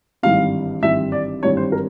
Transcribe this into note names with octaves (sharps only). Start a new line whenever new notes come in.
G#1 G2 E3 G3 C4 F5
G#1 G2 E3 G3 C4 E5
D5
G#1 G2 E3 G3 C4 C#5
C5
A#4